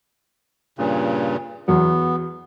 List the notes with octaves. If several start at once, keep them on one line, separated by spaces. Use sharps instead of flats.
G2 A#2 C#3
E2 F#3 B3